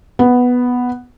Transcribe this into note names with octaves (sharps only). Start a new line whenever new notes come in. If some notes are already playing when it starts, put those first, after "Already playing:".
B3